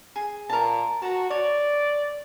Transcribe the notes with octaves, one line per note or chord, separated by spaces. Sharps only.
G#4
A#2 A#4 A5
F#4 A5 A#5
C#5 D5